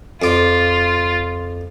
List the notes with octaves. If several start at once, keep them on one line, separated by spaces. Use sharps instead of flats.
F2 F4 D5